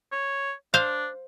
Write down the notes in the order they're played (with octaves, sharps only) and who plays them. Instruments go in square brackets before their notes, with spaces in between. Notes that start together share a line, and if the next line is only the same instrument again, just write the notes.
[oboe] C#5
[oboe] D4 [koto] C5 F5